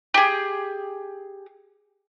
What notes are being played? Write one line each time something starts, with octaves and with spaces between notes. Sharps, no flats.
G4 G#4